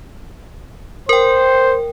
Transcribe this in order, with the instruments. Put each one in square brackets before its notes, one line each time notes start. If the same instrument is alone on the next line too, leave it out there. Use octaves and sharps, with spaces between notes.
[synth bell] A#4 G5 [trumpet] C5